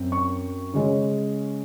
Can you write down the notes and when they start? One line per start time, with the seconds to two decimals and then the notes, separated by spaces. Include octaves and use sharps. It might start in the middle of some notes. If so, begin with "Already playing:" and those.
Already playing: F#2 C4
0.12 C#6
0.74 C#3 G#3 C#4